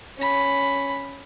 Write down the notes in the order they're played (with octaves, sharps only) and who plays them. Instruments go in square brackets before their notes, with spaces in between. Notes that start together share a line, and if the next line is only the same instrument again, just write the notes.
[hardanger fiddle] C#4 B5